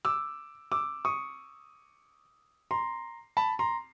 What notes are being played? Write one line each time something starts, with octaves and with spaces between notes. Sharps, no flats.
D6 E6
D6 E6
C#6 D#6
A#5 C6
A5 B5
A#5 C6